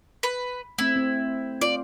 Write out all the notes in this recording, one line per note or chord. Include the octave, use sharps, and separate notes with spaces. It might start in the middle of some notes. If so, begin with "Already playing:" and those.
B4
A3 C4 E4
C4
F4 D5